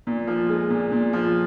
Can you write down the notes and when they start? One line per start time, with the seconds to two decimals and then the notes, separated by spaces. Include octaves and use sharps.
0.07 A#2
0.27 F3
0.49 G#3
0.70 A#2
0.92 A#2
1.13 F3